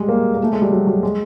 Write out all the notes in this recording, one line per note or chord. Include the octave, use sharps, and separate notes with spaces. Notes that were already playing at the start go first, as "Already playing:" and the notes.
Already playing: G3 G#3
A#3
A#3
A3
G#3
G3
F#3
F#3
G#3